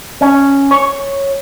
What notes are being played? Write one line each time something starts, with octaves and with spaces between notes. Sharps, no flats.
C#4
C#5